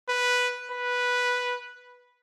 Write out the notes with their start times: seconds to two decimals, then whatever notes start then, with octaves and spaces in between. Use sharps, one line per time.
0.09 B4
0.71 B4